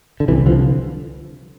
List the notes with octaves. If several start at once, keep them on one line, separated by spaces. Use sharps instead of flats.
D3
C2 C3 E3
D3 F3